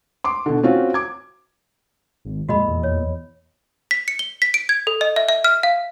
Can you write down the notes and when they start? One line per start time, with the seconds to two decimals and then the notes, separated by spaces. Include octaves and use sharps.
0.24 C6 D6
0.46 B2 D3
0.63 C4 C#4 F4 F#4
0.94 D6 G#6
2.25 G#1
2.49 F2 A#2 G#3 F#4 D#5 B5
2.67 E2
2.83 C#5
3.91 B6
4.08 C#7
4.19 G7
4.42 B6
4.54 D7
4.69 G#6
4.87 A4
5.01 D#5
5.16 E5
5.29 E5
5.44 F6
5.63 F5